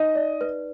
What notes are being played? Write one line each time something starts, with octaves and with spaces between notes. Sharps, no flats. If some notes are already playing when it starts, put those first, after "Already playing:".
Already playing: D#4 D#5
D5
B4